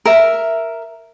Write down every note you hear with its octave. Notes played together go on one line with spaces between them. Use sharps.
A#4 E5